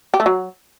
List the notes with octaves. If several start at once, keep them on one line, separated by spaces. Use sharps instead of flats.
G4
A3
F#3